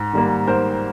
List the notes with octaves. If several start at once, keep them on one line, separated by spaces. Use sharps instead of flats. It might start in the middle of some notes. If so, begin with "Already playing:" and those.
Already playing: G#2
D#3 G3 A#3
G#2 A#4 C5